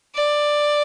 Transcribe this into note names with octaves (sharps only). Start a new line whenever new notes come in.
D5